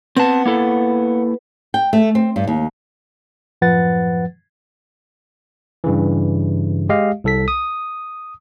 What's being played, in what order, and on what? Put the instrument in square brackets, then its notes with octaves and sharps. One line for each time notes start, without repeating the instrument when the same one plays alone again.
[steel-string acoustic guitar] B3 [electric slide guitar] C4 A5
[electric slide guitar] A#3 E4 A4
[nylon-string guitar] G5
A3
C4
G2
D#2
[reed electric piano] F#2 A2 F3 B4 F#5 A6
[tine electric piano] G2 C#3 E3
G#3 G4 D#5 F5
C2 A4 B6
D#6